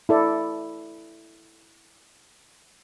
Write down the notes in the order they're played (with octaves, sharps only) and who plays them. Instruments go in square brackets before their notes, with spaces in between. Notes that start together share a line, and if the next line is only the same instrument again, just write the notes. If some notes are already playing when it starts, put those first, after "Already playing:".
[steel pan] E4 A4 D5